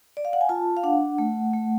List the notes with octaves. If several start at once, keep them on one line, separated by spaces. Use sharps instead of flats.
D5
F5
F#5
G#5
F4 A5
F5
D4 F#5
A3
A3